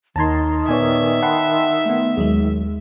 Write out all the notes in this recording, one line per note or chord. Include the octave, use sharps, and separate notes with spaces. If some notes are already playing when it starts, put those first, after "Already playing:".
D#2 D#3 A5 A#5 C6 G#6
A#2 B3 B4 C#5 D5 E5 G#5
F#5 G5 A5 B5 C6
A3 B3
D#2 F#3 G#3 G#4